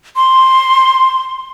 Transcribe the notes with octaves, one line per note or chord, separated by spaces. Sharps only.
C6